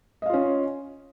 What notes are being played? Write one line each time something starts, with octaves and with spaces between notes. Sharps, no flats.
C#4 F4 D#5 F5